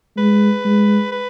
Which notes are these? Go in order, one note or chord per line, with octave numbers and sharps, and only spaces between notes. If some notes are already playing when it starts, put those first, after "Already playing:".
G#3 B4
G#3
B4